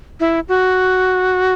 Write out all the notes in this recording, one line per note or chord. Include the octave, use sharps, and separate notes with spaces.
E4
F#4